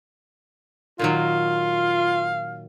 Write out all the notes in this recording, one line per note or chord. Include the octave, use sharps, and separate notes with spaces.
A#2 D#3 F#3 F4 F5